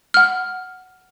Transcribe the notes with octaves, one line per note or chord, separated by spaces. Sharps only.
F#5 F6